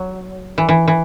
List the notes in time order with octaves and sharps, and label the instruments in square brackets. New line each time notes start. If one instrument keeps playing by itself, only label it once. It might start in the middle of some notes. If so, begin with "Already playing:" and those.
Already playing: [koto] F#3
E3
E3
E3